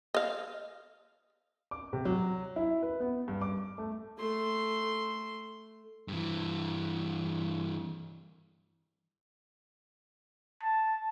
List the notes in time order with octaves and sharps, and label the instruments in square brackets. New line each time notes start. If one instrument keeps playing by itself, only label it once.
[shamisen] D#5 F5
[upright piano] D6
C3
F#3
E4
B4
B3
G2
D6
A3
[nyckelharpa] A3 C6
[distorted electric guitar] G2 E3
[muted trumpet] A5